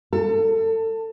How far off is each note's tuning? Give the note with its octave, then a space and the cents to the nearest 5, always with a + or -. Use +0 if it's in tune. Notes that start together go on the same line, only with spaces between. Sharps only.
A4 +30